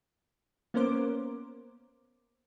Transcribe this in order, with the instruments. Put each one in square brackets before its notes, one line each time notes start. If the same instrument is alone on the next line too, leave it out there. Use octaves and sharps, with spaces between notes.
[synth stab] A#3 B3 C#4 A#4 C5 D6